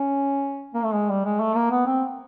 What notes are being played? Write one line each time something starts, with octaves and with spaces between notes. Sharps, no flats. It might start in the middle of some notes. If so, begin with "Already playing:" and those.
Already playing: C#4
A#3
A3
G#3
G3
G#3
A3
A#3
B3
C4